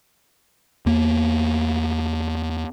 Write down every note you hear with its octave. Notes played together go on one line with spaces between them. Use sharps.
E2 A#3